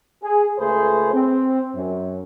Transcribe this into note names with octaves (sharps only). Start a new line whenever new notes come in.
G#4
C#2 A3 G#4 B4 C5
C4
F#2